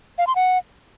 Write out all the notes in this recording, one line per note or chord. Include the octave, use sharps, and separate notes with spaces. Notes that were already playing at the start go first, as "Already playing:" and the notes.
F5
C6
F#5